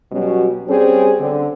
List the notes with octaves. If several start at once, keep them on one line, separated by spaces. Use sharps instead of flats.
B2 F#3 G3 C#4
G3 C4 C#4 G#4
D3 C4